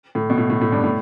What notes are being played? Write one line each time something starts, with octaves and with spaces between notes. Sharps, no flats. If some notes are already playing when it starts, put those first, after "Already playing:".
A2
B2
A2
A2
A2
G2
A2